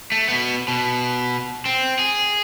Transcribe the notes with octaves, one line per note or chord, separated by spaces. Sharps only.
A3
B2 B3
B2
C4
G#4